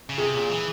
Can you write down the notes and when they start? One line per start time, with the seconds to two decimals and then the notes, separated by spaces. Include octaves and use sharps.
0.09 C#3
0.18 C3 G#4
0.35 A#2
0.49 E3